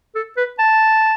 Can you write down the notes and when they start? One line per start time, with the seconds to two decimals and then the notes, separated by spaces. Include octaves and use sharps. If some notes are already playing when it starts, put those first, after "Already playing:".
0.15 A4
0.37 B4
0.59 A5